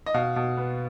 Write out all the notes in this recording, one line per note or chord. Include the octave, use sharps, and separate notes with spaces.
D#5
B2 F5
B2
B3